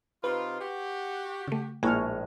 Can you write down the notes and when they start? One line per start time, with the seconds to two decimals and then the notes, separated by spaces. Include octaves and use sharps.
0.24 C3 D#4 F4 B4
0.61 F#4 G4
1.48 C#3 A3
1.83 A#1 A2 G#3 A#3 E4 G#5 C#6 F6